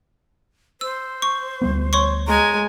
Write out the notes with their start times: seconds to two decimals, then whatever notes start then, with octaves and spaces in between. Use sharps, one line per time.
0.81 C5 E6
1.22 C#6
1.62 D2 G3 B3
1.93 C#5 C6 C#6
2.27 G#3 G#5 A#5